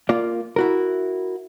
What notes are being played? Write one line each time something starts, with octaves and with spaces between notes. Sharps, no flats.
A#3 F4 D5
E4 F#4 A#4